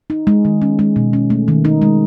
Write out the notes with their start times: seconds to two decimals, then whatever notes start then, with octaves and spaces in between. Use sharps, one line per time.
0.10 D#4
0.27 G#3
0.45 D#3
0.62 C#4
0.79 G#3
0.96 B2
1.13 C#4
1.30 A3
1.48 D#3
1.65 D#4
1.82 G#3